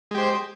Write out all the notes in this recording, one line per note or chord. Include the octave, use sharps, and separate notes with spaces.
G#3 G4 C5